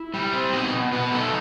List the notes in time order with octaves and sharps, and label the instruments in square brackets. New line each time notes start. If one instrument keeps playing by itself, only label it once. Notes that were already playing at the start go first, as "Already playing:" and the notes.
Already playing: [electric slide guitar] E4 E5
G3
C4
B2 D#4 D#5
B2
B2 B3 B4
A3 D#4 A4